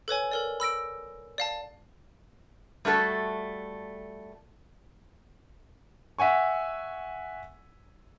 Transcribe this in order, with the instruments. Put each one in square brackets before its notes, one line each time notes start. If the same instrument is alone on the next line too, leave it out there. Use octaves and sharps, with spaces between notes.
[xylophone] A4 B4 C#5 G#5
A4 A#4 D5
B5 E6 A#6 D7
D5 F5 A5
[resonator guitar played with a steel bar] G3 A3 F#4 A4
[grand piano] E5 F#5 G#5 C#6